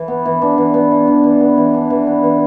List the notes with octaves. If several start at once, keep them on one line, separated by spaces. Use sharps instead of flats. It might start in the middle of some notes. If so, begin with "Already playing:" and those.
Already playing: E3
B3
E3
D4
E3
B3
E3
D4
E3
B3
E3
D4
E3
B3
E3